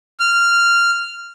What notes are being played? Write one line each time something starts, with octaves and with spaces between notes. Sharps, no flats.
F6